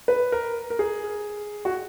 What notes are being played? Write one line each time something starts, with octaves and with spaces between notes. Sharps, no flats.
B4
A#4
A#4
G#4
F#4